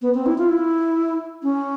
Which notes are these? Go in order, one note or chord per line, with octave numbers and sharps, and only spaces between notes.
B3
C4
E4
F4
E4
C#4